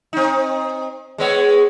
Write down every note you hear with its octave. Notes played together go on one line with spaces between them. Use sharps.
C4 D#4
G#3 B3 C#5